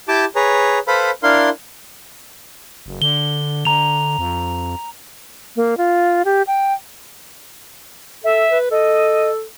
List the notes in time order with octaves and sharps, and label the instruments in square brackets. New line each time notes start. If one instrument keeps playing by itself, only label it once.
[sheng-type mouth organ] E4 G4 G5 A5 D6
G#4 B4 C#5 A#5
A4 B4 C5 F5 B5
D4 E4 A#4 F5 C6
[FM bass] F#1
[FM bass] D3 [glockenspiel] G7
[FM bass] D3 [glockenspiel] A#5 F7
[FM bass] F2
[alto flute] A#3
F4
G4
G5
[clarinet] A4 [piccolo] E5
[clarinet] B4
[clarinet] A4 [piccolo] D#5